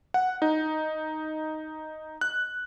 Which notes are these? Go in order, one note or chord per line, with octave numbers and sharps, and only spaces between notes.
F#5
D#4
F#6